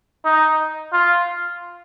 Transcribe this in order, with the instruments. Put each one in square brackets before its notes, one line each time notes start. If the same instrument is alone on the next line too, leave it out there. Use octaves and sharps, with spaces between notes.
[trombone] D#4
F4